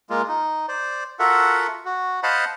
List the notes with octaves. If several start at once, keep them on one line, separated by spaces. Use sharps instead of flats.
G#3 A#3 F4
D#4
C5 D5
F4 F#4 A4 A#4 E5 F#5
F#4
C5 D#5 F5 F#5 A5 B5